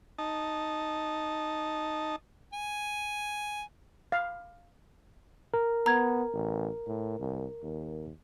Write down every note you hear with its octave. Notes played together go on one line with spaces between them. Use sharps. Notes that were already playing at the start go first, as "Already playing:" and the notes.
D#4 A5
G#5
F5
A#4
B3 A#5 G#6
A1
A2
C2
D#2